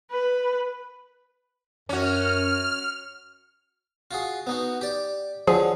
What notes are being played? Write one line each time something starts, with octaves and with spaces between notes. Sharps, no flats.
B4
F#2 C#4 F#4 F6
F4 F#4 G#4
B3 D#4 F#4
G4 D5
D3 F3 F#3 G#4